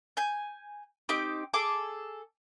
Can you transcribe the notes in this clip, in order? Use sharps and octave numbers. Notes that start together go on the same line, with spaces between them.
G#5 G6
C4 D#4 G4 D6
G#4 A4 D6